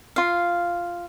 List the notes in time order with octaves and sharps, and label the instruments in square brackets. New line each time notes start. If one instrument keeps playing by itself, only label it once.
[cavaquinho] F4 F5